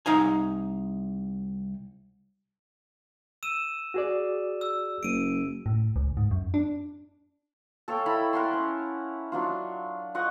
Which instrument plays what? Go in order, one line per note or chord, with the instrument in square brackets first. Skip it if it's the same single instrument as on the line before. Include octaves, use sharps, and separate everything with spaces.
[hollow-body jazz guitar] C2 D#4 F5 G#5
[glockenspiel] E6 D#7 E7
[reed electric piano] F#4 G#4 D5
[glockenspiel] E6
[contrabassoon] F#1 [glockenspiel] D7 D#7
[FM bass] A2
C#2
G#2
F#2
D4
[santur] A4 C#5 F5 G5
E4 A4 A#5 B5
A#4 F#5 A5 C6
C#4
F#3 D4 F4
F4 D#5 F#5 C#6